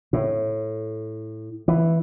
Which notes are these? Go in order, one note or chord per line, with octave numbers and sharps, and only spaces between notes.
A2
E3